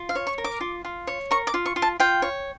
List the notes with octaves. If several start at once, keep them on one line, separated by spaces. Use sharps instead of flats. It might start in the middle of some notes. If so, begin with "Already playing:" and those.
Already playing: F4
F5
C#5
C#6
A#4
D6
F4
F4
C#5
A#4 C#6
D6
F4
C#6
F4
A5
F4 G5
C#5